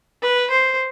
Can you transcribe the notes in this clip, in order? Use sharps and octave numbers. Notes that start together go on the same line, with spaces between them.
B4
C5